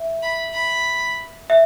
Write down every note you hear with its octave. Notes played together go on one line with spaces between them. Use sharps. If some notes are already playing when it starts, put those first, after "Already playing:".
Already playing: E5
B5
B5
E5